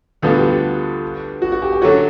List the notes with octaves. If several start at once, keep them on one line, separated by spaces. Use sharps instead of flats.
D2 D3 G3 B3 F4
G4
G4
F#4
F#4
G4
G4
D3 F#3 A3 C#4 F#4